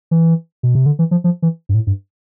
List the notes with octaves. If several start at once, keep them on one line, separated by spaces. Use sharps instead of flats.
E3
B2
C3
D3
E3
F3
F3
E3
G2
A2
G2